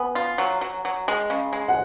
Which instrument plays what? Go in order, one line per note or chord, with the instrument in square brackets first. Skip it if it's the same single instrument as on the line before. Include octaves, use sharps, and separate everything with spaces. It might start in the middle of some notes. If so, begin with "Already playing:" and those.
Already playing: [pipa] B3 [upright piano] G#5
[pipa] F4
F#3
F#3
F#3
G#3
C#3
G#3
[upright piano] F#5